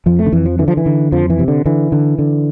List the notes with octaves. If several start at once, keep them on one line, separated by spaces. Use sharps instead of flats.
F2 F3
A3
D3
F2 E3
F3
D3 E3
F3
E3
D3
F2 F3
E3
C3
D3
D3 E3
D3
D3